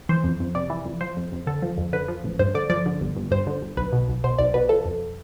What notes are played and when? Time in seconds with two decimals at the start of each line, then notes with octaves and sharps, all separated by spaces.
0.09 E3 C5
0.24 F2
0.40 F2
0.55 C3 D5
0.70 E3
0.86 F2
1.01 F3 C5
1.17 F2
1.32 F2
1.47 D3 A4
1.62 F3
1.78 F2
1.93 D3 B4
2.08 F3
2.24 A1
2.39 G2 C5
2.55 D3 D5
2.70 F3 D5
2.86 D3
3.01 G1
3.16 G1
3.31 G2 C5
3.47 D3
3.62 G1
3.77 B1 B4
3.93 B2
4.09 B1
4.24 B2 C5
4.38 B1 D5
4.54 B2 B4
4.69 F3 A4
4.85 F2